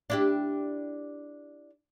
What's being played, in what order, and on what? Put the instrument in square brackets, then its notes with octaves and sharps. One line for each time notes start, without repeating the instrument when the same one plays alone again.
[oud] D4 E4 G4